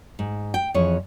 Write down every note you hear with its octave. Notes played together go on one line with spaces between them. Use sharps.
G#2
G5
F2 E3 G#4 C#5